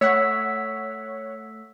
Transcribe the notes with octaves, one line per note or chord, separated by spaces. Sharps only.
A3 C#5 F#5 E6 B6